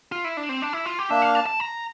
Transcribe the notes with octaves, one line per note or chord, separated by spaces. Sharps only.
F4
E4
D4
C4
D4
E4
F4
G4
A#3 D4 E5
F5
A5
A5
A#5